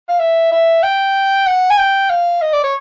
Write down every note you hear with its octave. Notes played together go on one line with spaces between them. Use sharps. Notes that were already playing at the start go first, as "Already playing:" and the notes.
F5
E5
E5
G5
F#5
G#5
G5
F5
D#5
D5
C#5